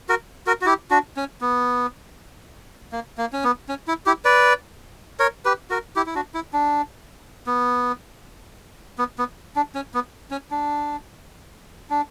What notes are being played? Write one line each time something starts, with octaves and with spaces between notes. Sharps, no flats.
F#4 A#4
F#4 A#4
F#4
E4 G4
D4 F#4
C#4
B3
A#3
A#3
C#4
B3
C#4
E4
E4 G4
B4 D5
A#4 C#5
G4 B4
F#4 A#4
E4 G4
E4
D4 F#4
E4
D4
B3
B3
B3
D4
C#4
B3
C#4
D4
D4